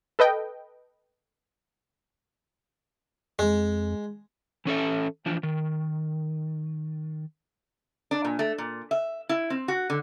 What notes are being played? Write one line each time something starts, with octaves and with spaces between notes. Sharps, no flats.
A4 B4 D#5 G5
F2 G#3
E3 C#4 A4 E5
E3 F3 D4
D#3
D4
A#2
A3
A#2
E5
E4
C4
F#4
D3